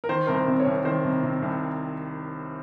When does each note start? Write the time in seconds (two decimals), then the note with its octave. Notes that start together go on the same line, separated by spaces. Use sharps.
0.04 A#4
0.09 D#3 C5
0.27 C2 A#4
0.34 C5
0.47 C3
0.60 C#5
0.66 C2
0.85 D#3 C5
1.04 C2
1.23 C3
1.42 C2